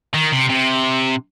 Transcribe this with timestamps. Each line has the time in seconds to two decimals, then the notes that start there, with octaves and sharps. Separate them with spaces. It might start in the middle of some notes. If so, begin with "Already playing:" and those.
0.14 D#3
0.32 C3
0.49 C3